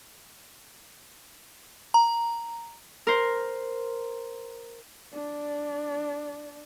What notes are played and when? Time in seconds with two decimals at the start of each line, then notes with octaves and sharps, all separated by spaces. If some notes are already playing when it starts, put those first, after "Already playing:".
1.94 A#5
3.07 A#4 C5
5.13 D4 D5